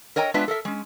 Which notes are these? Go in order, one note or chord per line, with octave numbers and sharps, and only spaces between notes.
A#4 C#5 D#5 G5 A#5
G#3 B3 D4 F4 B4 E5
A4 A#4 E5
G#3 C#4